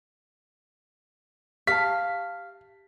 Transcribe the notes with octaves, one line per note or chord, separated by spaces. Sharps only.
G4 F5 A5 B6